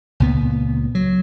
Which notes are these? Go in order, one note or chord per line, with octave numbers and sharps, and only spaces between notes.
C#2 A#2 B3
F#3